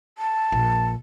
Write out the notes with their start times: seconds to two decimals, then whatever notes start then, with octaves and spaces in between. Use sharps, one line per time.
0.18 A5
0.52 A#1